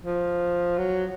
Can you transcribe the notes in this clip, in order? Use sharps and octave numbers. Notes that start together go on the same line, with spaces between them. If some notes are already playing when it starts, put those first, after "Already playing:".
F3
F#3